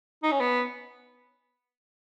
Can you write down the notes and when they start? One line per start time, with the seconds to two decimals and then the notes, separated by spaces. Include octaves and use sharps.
0.23 D#4
0.31 C#4
0.40 B3